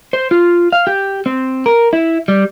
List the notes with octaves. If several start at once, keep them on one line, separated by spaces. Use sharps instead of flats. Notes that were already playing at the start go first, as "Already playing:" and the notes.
C5
F4
F5
G4
C4
A#4
E4
G3